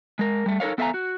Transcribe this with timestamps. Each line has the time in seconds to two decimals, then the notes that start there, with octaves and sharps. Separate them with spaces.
0.19 G#3 A#4
0.46 G3 A3
0.60 D#4 A4 A#4 C#5 F5
0.78 B3 A4 E5 F5 G#5 A#5
0.94 F#4